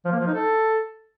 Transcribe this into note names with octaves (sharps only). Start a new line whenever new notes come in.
F3
A#3
F3
D#4
A4